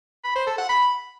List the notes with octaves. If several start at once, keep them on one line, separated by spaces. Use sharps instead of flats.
B5
C5
A4
F#5
B5